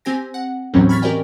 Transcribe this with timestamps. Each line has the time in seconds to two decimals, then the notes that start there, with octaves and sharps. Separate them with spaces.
0.05 C4 G4 G#5 A#6
0.34 F#5
0.74 D#2 A2 E3 F#3 C4 C#4
0.89 B5 C#6 F6 G#6 A6 B6
1.02 G4 A#4 D5 D#5 G5 G#5